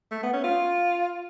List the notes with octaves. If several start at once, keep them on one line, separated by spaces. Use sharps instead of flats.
A3
B3
C#4
F4